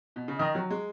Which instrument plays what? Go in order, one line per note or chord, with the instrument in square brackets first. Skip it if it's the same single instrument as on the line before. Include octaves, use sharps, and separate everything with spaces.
[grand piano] B2
C#3
[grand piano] D#3 [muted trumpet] D#5
[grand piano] F#3
G#3